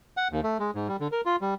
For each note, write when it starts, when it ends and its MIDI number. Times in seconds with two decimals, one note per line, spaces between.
0.17 0.28 78
0.32 0.41 39
0.44 0.58 57
0.60 0.71 56
0.75 0.88 44
0.88 0.97 55
1.00 1.08 50
1.12 1.21 70
1.25 1.36 65
1.41 1.54 55